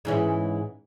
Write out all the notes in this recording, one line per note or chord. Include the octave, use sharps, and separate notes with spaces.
G#2 E3 C#4